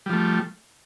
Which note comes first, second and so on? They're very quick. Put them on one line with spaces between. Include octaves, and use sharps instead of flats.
G3 F3 A3